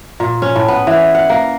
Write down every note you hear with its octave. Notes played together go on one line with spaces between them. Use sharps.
A#2
C#4
A2
B3
E3
F#5
A#3